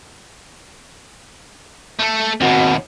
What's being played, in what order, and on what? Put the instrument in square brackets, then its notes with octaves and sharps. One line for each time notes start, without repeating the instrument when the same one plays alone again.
[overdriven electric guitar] A3 A4
[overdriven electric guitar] D#2 B2 [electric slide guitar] C4 F#4